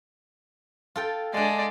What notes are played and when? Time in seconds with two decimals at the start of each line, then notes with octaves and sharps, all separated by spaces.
0.96 F4 A4 G5
1.34 G#3 A3 D4 D5